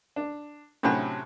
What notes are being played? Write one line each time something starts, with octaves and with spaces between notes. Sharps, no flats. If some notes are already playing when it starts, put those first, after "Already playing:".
D4
A2 C3 F#3 C#4 D4 B5